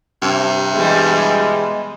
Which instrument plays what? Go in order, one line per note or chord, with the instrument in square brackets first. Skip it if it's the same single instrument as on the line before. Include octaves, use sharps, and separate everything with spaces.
[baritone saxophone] G2 [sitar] C3
[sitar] B2 E3 G3 [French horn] G#3